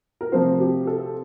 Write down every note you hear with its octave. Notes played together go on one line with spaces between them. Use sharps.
A#4
C3 F3 A3 C4 C5
G4
A4